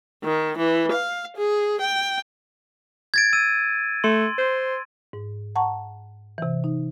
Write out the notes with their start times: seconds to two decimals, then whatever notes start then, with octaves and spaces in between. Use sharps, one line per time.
0.24 D#3
0.58 E3
0.92 F5
1.37 G#4
1.81 G5
3.14 G#6 A6 D7
3.33 E6 D#7
4.04 A3 C6
4.38 C5
5.13 G#2
5.56 F#5 A5 A#5 C#6
6.38 C3 E3
6.64 D#4